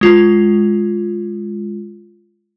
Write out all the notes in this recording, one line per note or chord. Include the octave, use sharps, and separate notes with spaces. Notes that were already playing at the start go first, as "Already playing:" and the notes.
G#3 F4